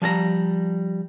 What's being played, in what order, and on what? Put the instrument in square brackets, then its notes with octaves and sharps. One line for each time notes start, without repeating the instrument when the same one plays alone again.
[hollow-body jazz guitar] F3 G3 A5 A#5